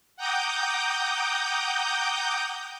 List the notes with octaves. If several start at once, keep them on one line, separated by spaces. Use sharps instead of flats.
F#5 G5 A#5 D6 D#6 G6